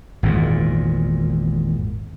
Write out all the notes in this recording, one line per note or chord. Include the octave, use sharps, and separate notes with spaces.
G#1 E2 A#2